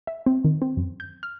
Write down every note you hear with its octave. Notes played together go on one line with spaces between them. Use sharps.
E5
C4
D#3
C4
F#2
G6
F6